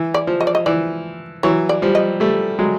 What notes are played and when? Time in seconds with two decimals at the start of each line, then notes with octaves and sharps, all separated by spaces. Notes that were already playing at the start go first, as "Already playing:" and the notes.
Already playing: E3
0.14 D5
0.27 F3
0.41 D#5
0.47 D5
0.55 D#5
0.66 E3 D5
1.43 E3 F#3 C#5
1.69 D5
1.82 F3 G3
1.95 D#5
2.20 G3 A3
2.59 F#3 G#3